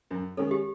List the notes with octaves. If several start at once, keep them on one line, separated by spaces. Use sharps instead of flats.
F#2
D#3 G#3 C#4 A4
G4